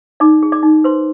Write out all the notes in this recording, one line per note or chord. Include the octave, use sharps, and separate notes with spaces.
D#4 D5 D6
G#4
D5 D6
D#4
B4 C5 C6